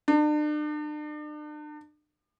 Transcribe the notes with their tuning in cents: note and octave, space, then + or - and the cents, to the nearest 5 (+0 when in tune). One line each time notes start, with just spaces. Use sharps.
D4 +40